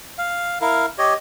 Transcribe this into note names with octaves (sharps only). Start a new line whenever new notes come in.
F5
E4 A#4 F5
G4 C#5 D#5